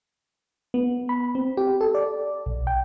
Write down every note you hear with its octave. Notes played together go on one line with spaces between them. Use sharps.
B3
B5
C4
G4
A4
D5
B1
G5